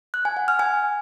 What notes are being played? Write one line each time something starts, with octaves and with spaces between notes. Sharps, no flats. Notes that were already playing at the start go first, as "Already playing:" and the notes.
F#6
G#5
F#5
F6
G#5